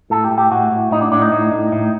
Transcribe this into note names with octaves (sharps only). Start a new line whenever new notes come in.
A2 A4
G4
A2
G4
A2 F#4
A2
A2 D#4
D4
A2 D4
D#4
A2
A2
A2